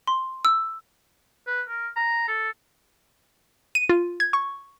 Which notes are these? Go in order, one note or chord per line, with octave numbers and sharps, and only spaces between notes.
C6
E6
B4
A#4
A#5
A4
D#7
F4
G#6
C#6